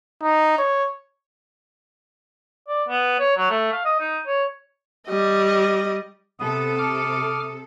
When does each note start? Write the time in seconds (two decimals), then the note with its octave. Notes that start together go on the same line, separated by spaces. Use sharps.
0.23 D#4
0.58 C#5
2.68 D5
2.89 B3
3.19 C#5
3.37 F#3
3.50 A3
3.73 F5
3.85 D#5
4.00 D#4
4.27 C#5
5.08 G3 D#5
6.40 C3 B3 A4 D#6
6.78 D6 F6